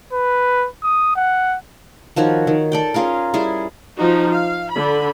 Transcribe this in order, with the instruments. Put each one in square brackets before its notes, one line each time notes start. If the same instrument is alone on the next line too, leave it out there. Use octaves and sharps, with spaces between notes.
[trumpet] B4
D#6
F#5
[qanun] D#3 F3 F#4 C#5
D#3
A4 D5 G5
C#4 F4 G#4 A#4
G3 E4 G#4
[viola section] F3 D#4 F#4
F5
D3 B5